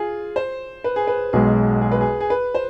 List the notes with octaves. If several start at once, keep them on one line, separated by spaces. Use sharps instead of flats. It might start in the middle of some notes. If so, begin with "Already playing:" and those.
Already playing: F4 G#4
C5
B4
G#4
B4
B1 B2 G#3 G#4
G#4
B4
G#4
G#4
B4
C5